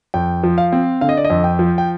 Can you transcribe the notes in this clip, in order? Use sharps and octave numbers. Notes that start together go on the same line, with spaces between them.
F2 G5
F3
F5
C4
D3 F5
D#5
D5
D#5
F2
G5
F3
G5